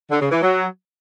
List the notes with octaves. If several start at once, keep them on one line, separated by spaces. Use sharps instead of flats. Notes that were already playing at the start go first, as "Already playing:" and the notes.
D3
C#3
E3
F#3